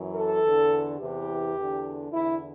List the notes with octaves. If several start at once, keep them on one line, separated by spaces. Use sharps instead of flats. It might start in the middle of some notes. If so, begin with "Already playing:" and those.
Already playing: F#2 E3
A4
E2 D3
E2 C3 E3 G4
E2 D3
E2 D3 E4